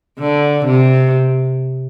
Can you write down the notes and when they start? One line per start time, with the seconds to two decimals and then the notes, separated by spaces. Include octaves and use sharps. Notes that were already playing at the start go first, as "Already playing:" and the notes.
0.20 D3
0.65 C3